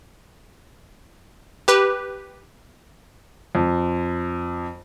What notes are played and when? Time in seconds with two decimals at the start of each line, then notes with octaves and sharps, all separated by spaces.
1.68 G4 B4
3.55 F2